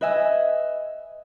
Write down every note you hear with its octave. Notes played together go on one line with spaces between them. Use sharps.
B4 D#5 E5 G#5